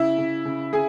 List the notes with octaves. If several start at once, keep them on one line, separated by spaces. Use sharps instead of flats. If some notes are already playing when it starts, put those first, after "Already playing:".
Already playing: C#3 E4 E5
C#3
C#3
C#3 G#4 G#5